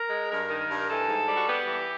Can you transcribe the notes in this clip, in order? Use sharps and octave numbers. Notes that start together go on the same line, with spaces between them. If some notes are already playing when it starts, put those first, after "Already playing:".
Already playing: A#4
G#3
G2 A#4
D#3
G2
E3 A4
G#2
G3
F#4
B3 G4
E3